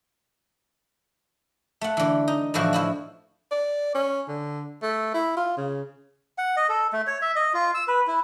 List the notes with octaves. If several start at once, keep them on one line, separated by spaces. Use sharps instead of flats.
A3 F#5
D3 E3
D#4
A2 D3 E3 F3 F#4
F3 E4 F#4
D5
C#4
D3
A3
E4
F4
C#3
F#5
D#5
A4
A3
C#5
E5
D#5
F4
E6
B4
E4